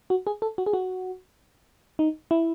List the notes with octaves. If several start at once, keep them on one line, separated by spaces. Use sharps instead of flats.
F#4
G#4
A4
F#4
G#4
F#4
D#4
E4